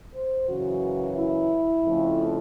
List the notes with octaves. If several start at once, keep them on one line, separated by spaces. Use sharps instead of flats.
C5
F#2 C#3 E3 F#4
E4
F2 C#3 F3 A3 C4